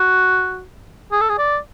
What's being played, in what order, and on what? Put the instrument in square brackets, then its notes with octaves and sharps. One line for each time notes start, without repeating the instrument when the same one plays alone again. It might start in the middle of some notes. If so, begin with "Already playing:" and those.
Already playing: [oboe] F#4
G#4
A4
G#4
D5